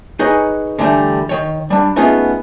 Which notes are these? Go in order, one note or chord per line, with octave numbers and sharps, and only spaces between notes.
D#4 G#4 B4 C#5 D#5 G#5
D3 E3 F3 G3 A3
D#3 C#5
G3 D4
A3 B3 C#4 D#4 F4 G#4